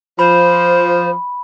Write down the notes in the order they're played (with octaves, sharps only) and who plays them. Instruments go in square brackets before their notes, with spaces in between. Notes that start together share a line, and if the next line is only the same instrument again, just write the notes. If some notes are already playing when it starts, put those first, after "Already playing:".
[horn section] F3 [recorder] C5 [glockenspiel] B5